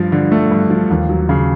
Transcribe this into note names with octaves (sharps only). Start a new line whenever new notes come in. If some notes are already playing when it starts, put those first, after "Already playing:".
Already playing: G2 F3
D3
A3
G2
F3
D#2
F#3
C#3